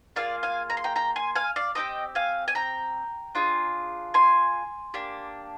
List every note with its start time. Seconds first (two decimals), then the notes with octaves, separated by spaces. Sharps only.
0.16 A#3 F4 G#4 D5 F5
0.43 F5 G#5
0.70 A#5
0.77 C6
0.84 G5 A#5
0.96 G5 A#5
1.16 G#5 C6
1.36 F5 G#5
1.56 D5 F5
1.75 C4 D#4 G4 D#5 G5
2.15 F5 G#5
2.48 G#5
2.55 G5 A#5
3.35 D4 F4 G#4
4.14 G#5 C6
4.94 A#3 D4 G4